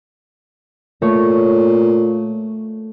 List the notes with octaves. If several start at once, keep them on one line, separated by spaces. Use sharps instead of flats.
A#2 A3 C#5